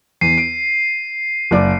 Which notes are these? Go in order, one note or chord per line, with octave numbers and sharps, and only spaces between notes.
E2 C7 D#7
D7
F#1 D5 D6